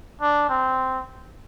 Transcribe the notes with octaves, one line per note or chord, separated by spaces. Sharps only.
D4
C4